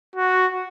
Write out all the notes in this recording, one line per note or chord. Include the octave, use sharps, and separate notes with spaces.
F#4